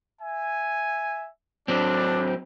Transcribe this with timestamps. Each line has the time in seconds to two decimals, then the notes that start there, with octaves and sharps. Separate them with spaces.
0.21 E5 G#5
1.68 F#3 C4 D4